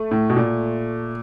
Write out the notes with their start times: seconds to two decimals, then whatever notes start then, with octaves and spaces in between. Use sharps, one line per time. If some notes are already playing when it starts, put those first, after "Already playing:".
Already playing: A3
0.11 A2
0.30 B2
0.37 A#2